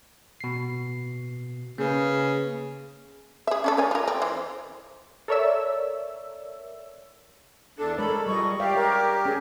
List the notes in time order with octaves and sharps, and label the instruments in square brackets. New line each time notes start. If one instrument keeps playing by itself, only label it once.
[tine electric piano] B2 C7
[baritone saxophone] C#3 [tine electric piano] A#3 B4
[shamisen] G#4 E5
C#4 D4 A4
A#4 C#5 G#5
F4 A#4
C4
E3 C5
[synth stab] A4 A#4 C#5 D5 E5 E6
[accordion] E2 D4 [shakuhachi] A4
[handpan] G#3 A#4 C#5 [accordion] A4 [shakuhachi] B5
[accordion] A#2 [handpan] G3 G#3 D#5 [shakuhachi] C#6
[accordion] G4 [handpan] D5 E5 F5 [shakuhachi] G5
[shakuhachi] A#4 [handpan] C#5
[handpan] C#4 [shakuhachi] G#4